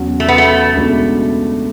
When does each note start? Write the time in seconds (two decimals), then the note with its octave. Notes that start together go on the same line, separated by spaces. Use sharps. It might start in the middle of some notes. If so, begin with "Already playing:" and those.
Already playing: E2 C#3 F#3 C#4 F#4
0.20 A3
0.28 B3
0.38 A3
0.74 C#2 B2 A3 D4 F#4